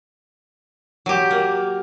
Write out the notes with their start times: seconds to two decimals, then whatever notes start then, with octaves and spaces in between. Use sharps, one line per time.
1.06 F#3 G4
1.31 A#3